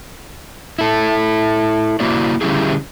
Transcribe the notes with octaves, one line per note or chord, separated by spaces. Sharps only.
E4 A4
A#3 E4 F#4 C5 D5
D3 G3 C#4 E4 G4 G#4